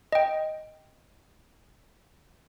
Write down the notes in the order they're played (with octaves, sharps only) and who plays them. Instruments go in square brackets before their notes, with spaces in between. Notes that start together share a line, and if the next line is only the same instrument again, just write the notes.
[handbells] D#5 G5